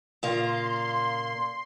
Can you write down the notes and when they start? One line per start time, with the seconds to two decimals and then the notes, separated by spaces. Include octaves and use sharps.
0.23 A#2 C#3 A#3 C6